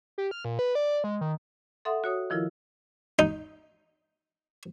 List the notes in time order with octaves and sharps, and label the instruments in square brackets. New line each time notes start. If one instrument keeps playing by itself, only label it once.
[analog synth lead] G4
F6
A#2
B4
D5
G#3
D#3
[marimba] A4 E5 F#5 C6 D#6
F#4 C#5 D#6
D#3 F3 E4 F4 A#4
[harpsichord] D#4